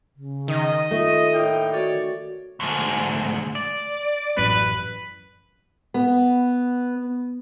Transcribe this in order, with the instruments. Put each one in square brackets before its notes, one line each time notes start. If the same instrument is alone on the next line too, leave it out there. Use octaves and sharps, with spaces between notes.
[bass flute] C#3
[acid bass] D#3 [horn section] D#5
[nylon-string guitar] A3 [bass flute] F4
[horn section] A2 A#3 G5
[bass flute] F#4 [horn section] C#5 D5
[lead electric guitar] D2 G#2
D5
[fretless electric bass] A1 F#2 [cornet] B4
[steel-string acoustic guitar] B3